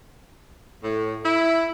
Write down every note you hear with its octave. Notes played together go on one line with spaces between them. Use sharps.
A2
E4